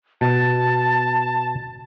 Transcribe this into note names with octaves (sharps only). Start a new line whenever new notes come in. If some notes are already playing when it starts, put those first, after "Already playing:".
B2 A5